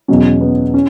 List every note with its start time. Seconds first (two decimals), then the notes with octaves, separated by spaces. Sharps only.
0.08 E2 B2 F#3 C#4
0.41 B3
0.74 C#4